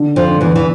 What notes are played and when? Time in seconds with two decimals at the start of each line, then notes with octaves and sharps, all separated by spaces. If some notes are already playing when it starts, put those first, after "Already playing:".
Already playing: D3
0.16 F2 F3
0.29 D3
0.41 E2 E3
0.56 E3